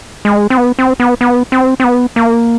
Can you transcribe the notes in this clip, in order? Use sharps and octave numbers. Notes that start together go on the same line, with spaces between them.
G#3
C4
B3
C4
B3
B3
C4
C4
B3
A#3